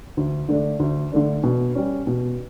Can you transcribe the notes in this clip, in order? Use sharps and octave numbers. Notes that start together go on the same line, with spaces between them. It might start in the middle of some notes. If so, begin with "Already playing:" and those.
D2
D3 A3 D4
D2
D3 A3 D4
B2
G3 C#4
B2